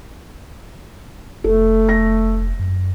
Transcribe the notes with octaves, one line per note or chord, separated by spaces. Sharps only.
F1 A3 A4
A#6
F#2